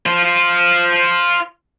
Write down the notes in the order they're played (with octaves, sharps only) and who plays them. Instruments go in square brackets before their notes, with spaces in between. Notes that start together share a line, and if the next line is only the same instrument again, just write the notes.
[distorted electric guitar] F4 C5